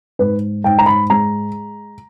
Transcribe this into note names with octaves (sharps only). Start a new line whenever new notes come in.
G#2 B4
G#2 G5
A#5
B5
G#3 A#5